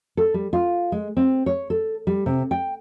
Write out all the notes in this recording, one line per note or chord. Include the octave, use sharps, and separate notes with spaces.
A4
G3
F4
G#3
C4
C#5
A4
G3
C3
G5